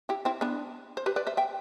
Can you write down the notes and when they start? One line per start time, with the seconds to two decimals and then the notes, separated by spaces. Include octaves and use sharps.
0.09 E4 G4
0.25 C4 E4
0.41 B3 D4
0.97 C5
1.06 G4 B4
1.16 B4 D5
1.27 C5 E5
1.37 E5 G5